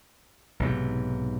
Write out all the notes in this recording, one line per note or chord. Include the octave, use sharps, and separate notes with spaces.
B1 G#2 C3